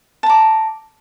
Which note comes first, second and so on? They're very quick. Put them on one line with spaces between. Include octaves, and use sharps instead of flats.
A5 A#5 D6